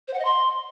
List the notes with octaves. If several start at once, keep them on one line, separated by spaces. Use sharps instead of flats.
C5
F#5
D#5
C6